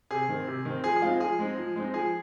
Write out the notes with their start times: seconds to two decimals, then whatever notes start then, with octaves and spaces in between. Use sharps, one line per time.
0.11 C3 G#4
0.29 D#3 C4
0.47 C3
0.65 D#3 C4
0.84 F3 G#4
0.96 G#4
1.02 G#3 C4 D#4 F4
1.20 F3 G#4
1.39 G#3 C4 D#4
1.58 F3
1.76 G#3 C4 D#4
1.94 F3 G#4